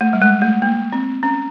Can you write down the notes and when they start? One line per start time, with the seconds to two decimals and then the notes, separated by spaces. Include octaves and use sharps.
0.01 A3
0.13 G3
0.22 G#3
0.42 A3
0.62 A#3
0.92 C4
1.23 C#4